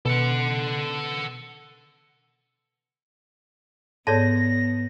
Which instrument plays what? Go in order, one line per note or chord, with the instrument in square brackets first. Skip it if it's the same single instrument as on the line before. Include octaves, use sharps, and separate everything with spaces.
[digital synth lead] B2 [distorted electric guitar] A4 F#5
[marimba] G#2 A4 [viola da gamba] B3 [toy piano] C#5 D5 A5 [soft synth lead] A#6